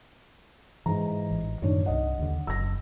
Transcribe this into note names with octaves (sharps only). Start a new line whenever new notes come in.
G#2 E3 A#5
A1
F#2 A2 D#3 D4 D#4 C#5
C2 G2 D#5 F#5
D#2 D3
F#1 F#2 E6 A#6